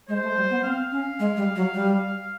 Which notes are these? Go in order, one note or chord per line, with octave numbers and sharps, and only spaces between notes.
G#3 C5
A3
G3
B3
C4 F5
C#4
G#3
G3
F#3
G3